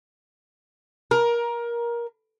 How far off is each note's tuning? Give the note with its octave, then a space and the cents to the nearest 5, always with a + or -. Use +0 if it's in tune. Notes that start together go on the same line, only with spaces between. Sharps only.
A#4 +20